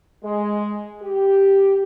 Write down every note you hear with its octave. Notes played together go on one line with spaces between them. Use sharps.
G#3
G4